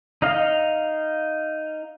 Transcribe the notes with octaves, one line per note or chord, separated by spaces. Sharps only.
D#4 D#5 F5